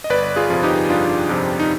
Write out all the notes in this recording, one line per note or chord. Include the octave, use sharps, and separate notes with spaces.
D#5
G1 B4 D5
F4 G#4
F2 C3 F3
D#4 G4
G1 D4 F4
F2 C3 F3
D#4